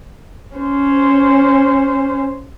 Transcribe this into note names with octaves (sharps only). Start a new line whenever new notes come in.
C#4 C5